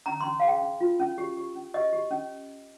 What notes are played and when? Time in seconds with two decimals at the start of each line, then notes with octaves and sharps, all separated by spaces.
0.06 C#4 A#5
0.21 C#4 C6
0.40 F5
0.43 G#4 G5
0.62 C#4
0.81 F4
1.00 C#4
1.18 G4
1.37 G4
1.55 C#4
1.74 G4 D#5
1.93 G4
2.11 C#4